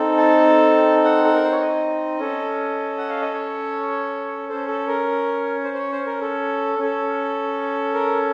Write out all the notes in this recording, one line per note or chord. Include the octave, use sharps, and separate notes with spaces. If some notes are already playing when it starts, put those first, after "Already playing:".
Already playing: C4 D#4 A4
A5
F#5
A4
A#4
C5
C#5
D#5
C#4 A4
F#5
F5
D#5
C#5
C#4 A4 C5
A4
A#4
C5
C5
C#5
C5
A#4
A4
C#4 A4
A#4